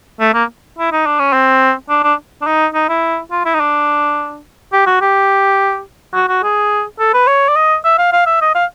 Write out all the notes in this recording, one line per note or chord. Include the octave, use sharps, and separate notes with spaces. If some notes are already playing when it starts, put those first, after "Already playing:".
A3
A#3
E4
D#4
D4
C#4
C4
D4
D4
D4
D#4
D#4
E4
F4
E4
D#4
D4
G4
F#4
G4
F#4
F#4
G#4
A4
B4
C#5
D5
D#5
E5
F5
F5
E5
D#5
F5